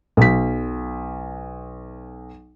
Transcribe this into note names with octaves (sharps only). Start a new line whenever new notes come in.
B1 B6